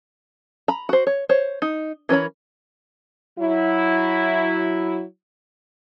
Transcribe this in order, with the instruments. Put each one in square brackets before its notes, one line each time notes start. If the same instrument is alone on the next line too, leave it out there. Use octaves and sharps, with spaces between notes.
[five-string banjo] A#5 B5
F#4 C5
C#5
C5 C#5
D#4
E3 C#4 A#4 C#5 B5
[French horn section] F#3 E4